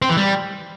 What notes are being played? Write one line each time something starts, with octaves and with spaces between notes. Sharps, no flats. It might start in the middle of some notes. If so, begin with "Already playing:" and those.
C4
E3
G3